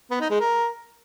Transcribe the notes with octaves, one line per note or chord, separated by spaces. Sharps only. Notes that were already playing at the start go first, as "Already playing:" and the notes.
B3
D#4
G#3
A#4